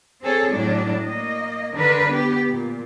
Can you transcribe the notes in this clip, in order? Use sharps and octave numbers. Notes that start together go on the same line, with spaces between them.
C4 G#4 A4 C#5
A2 F#3 D4
A#3 D#5
D3 D4 A#4 B4
B3 G4
A#2